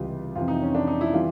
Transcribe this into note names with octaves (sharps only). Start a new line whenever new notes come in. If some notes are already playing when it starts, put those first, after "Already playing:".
Already playing: C#2 C3 E3 G3 F4
F2 C3 E3 F4
D#4
C#4
D4
D#4
E4
E3 G3 F4